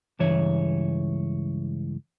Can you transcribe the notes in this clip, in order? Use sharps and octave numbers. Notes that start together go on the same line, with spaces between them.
C#2 G2 E3 C#5